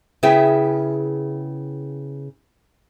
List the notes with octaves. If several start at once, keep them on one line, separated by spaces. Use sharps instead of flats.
C#3 B3 E4 G#4 E5 G5